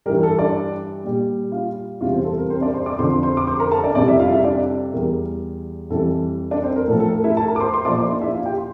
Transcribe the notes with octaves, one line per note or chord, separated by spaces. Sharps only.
G2 E3 G3 A#4
A4
D4 D5
A#2 G3
F4 F5
E2 C3 E3 G3 F4 F5
C4 C5
A4
A#4
C4 C5
D4 D5
C5 C6
D5 D6
F2 D3 F3 C5 C6
C5 C6
D6
C5 C6
A#4 A#5
A4 A5
D4 D5
F2 C3 G3 D4 D5
E4 E5
F4 F5
D5
E4 E5
D4 D5
E2 E3 G3 A#4
F2 E3 G3 A4
D4 D5
C4 C5
A#4
A2 F3 A4
A4
A#4
E4 E5
A4 A5
A#4 A#5
D6
C5 C6
C5 C6
A#2 F3 D5 D6
C5 C6
D4 D5
E4 E5
F4 F5
G4 G5
C6